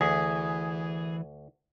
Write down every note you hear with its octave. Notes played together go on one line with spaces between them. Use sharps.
D2 E3 G#4